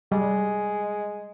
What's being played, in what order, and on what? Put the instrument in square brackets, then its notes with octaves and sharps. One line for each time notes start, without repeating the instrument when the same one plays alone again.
[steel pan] G3 [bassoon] G#3